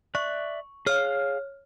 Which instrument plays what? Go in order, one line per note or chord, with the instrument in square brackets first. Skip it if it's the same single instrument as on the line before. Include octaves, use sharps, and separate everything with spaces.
[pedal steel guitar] D5 E5 F#6 [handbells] C#6
[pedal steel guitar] G#4 F5 [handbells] C#5 F6